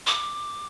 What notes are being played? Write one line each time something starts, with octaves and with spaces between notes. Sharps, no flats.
D6